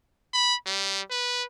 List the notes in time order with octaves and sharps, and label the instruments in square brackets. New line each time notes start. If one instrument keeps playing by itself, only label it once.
[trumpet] B5
G3
B4